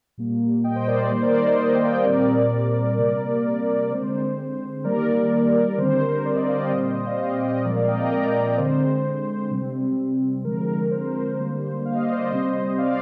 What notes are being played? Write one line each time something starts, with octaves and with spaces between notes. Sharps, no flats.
A#2 G3 A#3
D#5 G5
C5
A#4 D5
C5
A#4
D#3 G3 A#3 C5
A#4 D5
C5
C5 D#5
G5
F5
D#5
A#2 G3 C4 A#4 D5
C3 G3 A#3
D3 G#3 C4 C5
D#3 G3 A#3 A#4 D5
D3 G3 C4 C5
A#4
A#4 D5
C5 D#5
D5 F5
D#5 G5
A#2 G3 C4 C5 D#5
C5 D#5
C5 D#5
D5 F5
D#5 G5
C5 D#5
A#2 F3 G#3 C4 A#4 D5
D5 F5
D#5 G5
G5 A#5
A#4 D5
D3 G#3 C4 C5
C3 G3 C4
D3 F3 G#3 C4 A#4
C5
D3 G3 A#3
F5
D#5
D5
C5 D#5
C3 G3 C4
D5 F5